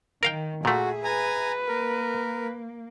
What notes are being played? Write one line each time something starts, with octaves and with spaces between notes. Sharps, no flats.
D#3 A#4 F5 G5
A#2 A3 F#4 G#4 E5
B4 G#5 A#5
A#3 A#4